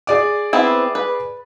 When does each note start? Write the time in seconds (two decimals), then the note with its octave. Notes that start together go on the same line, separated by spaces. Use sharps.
0.07 G#4 D5 D6
0.53 B3 C4 E4
0.95 B4